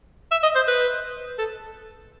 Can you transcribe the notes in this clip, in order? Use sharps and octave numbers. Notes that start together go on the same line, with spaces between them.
E5
D#5
C5
B4
A4